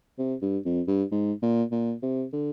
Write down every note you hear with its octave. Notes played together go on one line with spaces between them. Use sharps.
C3
G2
F2
G2
G#2
A#2
A#2
C3
D3